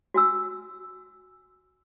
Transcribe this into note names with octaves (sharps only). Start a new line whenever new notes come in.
F#4 G#5 E6